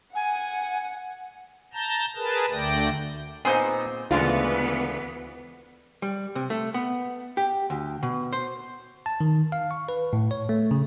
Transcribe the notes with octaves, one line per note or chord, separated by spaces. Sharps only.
F#5 G#5
A5 A#5 G6
G#4 A#4 B4 A5
D2 D3 A3 D5 G5 A#6
A#2 B3 C4 D#4 G#4 C5
D2 C#3 E3 G#3 B3 F4
G3
C3
A3
B3
G4
D2
B2
C5
A5
D#3
F5
C#6
B4
A2
C#5
A3
C#3